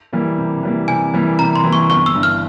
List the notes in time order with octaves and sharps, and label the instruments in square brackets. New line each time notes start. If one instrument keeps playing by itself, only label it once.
[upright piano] E3 G3 A#3
C3
E3 G3 A#3
[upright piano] C3 [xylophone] G#5
[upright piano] E3 G3 A#3
[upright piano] C3 [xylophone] A#5
[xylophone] C6
[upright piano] E3 G3 A#3
[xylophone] C#6
[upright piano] G1 [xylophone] C#6
[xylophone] E6
[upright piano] G2 E3
[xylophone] F6